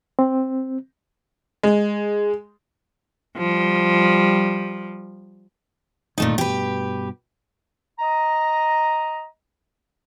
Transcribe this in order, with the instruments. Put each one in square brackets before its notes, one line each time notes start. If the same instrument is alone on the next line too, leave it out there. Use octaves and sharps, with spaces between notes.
[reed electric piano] C4
[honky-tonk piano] G#3
[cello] F3 G3
[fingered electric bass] G1 D#3 [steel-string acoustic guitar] A#2 A3 D#4
[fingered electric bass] G2 B2 [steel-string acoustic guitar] G4 B4
[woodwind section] D#5 A#5